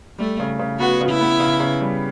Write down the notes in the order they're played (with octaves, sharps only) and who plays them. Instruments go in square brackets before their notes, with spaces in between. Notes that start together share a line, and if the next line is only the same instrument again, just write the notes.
[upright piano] G3 [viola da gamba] A3
[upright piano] C#3
C#3
[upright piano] B3 [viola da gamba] F#4
[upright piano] C#3
[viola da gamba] E4
[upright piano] B3
C#3
C#3
G3